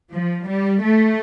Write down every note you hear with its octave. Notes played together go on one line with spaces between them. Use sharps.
F3
G3
A3